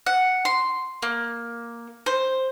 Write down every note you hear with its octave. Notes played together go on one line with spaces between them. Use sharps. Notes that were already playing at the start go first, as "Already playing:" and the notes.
F#5
C6
A#3
C5